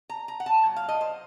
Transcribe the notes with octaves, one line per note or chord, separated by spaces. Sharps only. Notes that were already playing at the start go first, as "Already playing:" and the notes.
A#5
A#5
F#5
A5
A#2 F#3
F5
D#5
C5